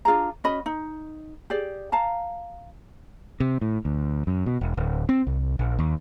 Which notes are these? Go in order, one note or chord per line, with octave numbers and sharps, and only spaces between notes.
D4 F4 G#4 A#5
C#4 F#4 D#5 B5
D#4
G4 G#4 D5
F5 A5 A#5
C3
A2
D2
F#2
B2
E1
D1
C4
C2
A#1
D#2